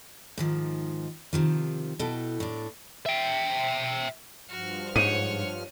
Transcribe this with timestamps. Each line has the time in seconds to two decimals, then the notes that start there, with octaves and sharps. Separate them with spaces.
0.38 G#2 D#3 F3
1.33 C3 D#3 F3
1.99 B2 E4 A4 G5
2.40 A2 D4
3.06 E5 G5
4.49 G2 F3 F#4 F6
4.96 G#2 C#5 F#5 D#7